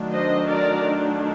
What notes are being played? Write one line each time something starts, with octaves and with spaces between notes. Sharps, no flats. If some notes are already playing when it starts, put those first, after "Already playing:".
Already playing: D#3 F#3 A3 D4
C5 D#5
A#4 D5